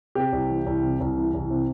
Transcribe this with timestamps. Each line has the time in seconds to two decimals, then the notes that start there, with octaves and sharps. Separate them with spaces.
0.15 C3 G4
0.33 C2
0.50 E3
0.66 C2
0.83 C3
1.00 C2
1.18 E3
1.34 C2
1.50 C3